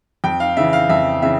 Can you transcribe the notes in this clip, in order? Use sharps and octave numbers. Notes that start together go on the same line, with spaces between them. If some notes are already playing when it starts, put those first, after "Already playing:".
F2 G5
F5
C#3 E3 E5
F5
F2 E5
C#3 E3 E5